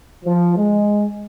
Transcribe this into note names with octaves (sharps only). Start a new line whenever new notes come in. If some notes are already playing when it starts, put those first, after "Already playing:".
F3
G#3